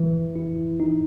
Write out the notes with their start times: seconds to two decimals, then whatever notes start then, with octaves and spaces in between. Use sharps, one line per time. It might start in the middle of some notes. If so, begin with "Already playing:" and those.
Already playing: E3
0.36 E4
0.80 D#4